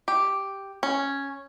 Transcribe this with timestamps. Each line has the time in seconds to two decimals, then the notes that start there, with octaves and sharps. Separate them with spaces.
0.08 G4
0.83 C#4